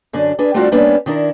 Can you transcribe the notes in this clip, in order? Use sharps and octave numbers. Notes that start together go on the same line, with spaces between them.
F#2 D3 D4
D4 G#4 B4
G3 A3 C4 D4 F4 F#4
G3 A#3 B3 C#4 D4 B4
D#3 D4 E4 A#4